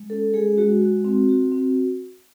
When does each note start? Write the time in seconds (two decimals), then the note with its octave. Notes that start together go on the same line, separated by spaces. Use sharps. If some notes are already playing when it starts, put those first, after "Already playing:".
Already playing: G#3
0.10 C#4 A4
0.34 G#3 G#4
0.58 G#3 F#4
0.82 F#4
1.05 C4
1.29 F#4
1.52 C4